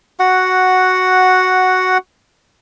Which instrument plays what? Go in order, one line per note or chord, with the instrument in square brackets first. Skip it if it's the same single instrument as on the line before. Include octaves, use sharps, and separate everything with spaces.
[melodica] F#4 F#5